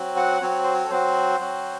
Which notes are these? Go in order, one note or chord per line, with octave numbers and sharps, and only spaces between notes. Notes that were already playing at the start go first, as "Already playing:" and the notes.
Already playing: F#3 C4 F#4
F#5
F#3 C4 F#4 C#5
C5
C#5
A4
F#3 C4 F#4 C5
F#3 C4 F#4